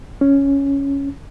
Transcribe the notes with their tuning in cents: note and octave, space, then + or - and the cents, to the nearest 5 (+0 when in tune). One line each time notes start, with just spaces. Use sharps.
C#4 +5